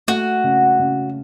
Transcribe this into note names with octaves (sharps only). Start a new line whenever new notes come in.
A3 F#4
C#3
C#3